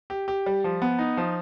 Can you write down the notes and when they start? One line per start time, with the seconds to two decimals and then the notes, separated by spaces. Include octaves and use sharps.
0.10 G4
0.28 G4
0.46 G3
0.64 F3
0.82 B3
0.99 D#4
1.17 F3